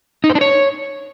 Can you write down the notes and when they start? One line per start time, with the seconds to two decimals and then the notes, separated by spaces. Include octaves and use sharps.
0.24 D#4
0.30 C5
0.35 D4
0.41 C#5